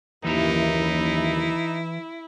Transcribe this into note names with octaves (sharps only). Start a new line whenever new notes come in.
F#1 D#2 E3 D#4 E4 E5 A#5